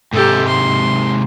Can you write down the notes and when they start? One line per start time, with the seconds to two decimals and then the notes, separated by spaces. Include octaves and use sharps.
0.14 G#2 C3 G4 A4
0.48 C6